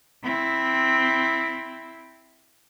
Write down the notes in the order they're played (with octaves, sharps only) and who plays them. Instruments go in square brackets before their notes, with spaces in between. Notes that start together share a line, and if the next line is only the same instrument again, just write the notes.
[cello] C4 E4